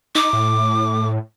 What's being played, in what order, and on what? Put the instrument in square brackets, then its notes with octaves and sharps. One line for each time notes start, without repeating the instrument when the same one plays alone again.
[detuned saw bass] D#4 [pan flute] D6
[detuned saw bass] A2